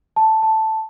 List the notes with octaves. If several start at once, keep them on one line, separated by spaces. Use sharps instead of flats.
A5
A5